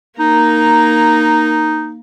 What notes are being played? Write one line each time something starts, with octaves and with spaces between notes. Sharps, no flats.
A#3 D#4 A#5